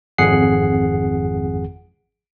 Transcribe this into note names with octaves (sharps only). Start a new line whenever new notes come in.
G#1 F2 G#4 F#5 C7